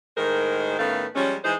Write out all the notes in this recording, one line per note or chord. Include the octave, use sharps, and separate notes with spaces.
A2 D#3 G#3 D#4 A#4 C5
A2 D#3 A3 B3 C#4 F5
F3 G3 G#3 C#4
E3 G#3 D#4 G#4 C5